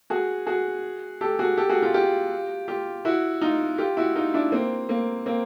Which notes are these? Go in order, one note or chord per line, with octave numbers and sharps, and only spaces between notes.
F#4 G#4
F#4 G#4
G4 A4
F#4 G#4
G4 A4
F#4 G#4
F4 G4
F4 G4
F4 G4
E4 F#4
D#4 F4
F4 G4
E4 F#4
D#4 F4
D4 E4
A#3 C4
A#3 C4
A#3 C4